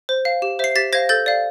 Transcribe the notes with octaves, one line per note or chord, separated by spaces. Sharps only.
C5
F5
G4
C5 E5 C7
G4 A6 B6
C5 F5 G#6 A#6
A4 G6 A6
D5 F5